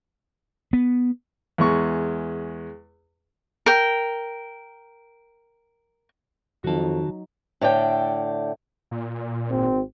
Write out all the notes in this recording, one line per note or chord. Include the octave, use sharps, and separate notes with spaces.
B3
E2 G#3 C#6
A#4 G5
F2 D#3 F#3 D#4 F#4 A5
A2 D3 D5 G5
A#2
G#1 C4